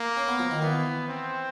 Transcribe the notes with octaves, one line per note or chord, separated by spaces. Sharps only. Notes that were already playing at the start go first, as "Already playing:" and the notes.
Already playing: A#3
C#4
B3
F3
D#3
E3 B3
C4